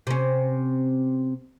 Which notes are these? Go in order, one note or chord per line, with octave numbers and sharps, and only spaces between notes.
C3 C#4